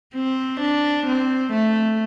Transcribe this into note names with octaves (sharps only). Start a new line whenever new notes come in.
C4
D4
C4
A3